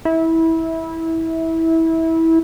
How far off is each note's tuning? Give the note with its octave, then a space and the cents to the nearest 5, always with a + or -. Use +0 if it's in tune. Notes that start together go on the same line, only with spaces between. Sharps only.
E4 -20